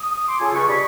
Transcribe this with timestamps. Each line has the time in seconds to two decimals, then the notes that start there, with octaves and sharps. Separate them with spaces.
0.01 D#6
0.13 D#6
0.28 C6 D6
0.40 C#3 F4 A4 G#5
0.53 C#2 C#3 G3 B4 C#6
0.68 D4 G4 C#5 D#5 B5 C#6